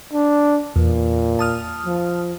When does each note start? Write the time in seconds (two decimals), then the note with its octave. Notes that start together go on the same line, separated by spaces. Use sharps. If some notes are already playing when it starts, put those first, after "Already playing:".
0.13 D4
0.76 E2 A#2
1.39 A5 D#6 F6
1.86 F3